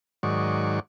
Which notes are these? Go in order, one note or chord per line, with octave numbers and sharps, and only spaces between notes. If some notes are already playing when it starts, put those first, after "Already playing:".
G#2 D#3 F#3 D5 C#6